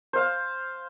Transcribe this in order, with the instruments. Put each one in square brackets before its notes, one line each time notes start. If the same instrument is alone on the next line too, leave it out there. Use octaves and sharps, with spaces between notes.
[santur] C5 F5